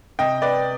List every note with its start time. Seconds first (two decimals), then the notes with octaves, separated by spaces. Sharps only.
0.19 C3 D#5 G5
0.42 B4 D5